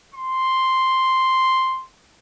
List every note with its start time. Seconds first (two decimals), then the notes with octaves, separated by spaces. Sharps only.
0.14 C6